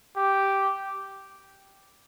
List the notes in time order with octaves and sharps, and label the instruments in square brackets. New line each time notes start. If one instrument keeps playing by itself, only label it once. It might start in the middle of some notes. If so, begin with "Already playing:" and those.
[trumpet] G4